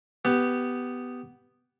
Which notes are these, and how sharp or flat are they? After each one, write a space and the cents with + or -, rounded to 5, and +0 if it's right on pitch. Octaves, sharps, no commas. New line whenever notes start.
B3 +5 G4 -5